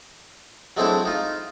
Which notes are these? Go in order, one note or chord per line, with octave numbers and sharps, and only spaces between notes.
F#3 G#3 A3 C4 D4 E4
D#4 F4